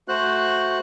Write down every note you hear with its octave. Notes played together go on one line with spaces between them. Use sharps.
A3 F#4 C5 F#6